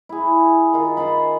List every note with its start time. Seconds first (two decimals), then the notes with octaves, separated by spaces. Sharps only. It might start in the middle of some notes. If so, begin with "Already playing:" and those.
0.09 E4 G#4
0.73 D#3 F4
0.97 C5 G#5 A5 B5